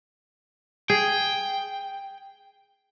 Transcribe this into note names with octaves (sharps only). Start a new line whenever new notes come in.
G#4 G5